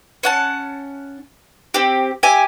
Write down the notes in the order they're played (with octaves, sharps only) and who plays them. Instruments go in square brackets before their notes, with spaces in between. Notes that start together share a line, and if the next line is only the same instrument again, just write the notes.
[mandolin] C#4 F#5 A5
C4 G4
G4 E5 G#5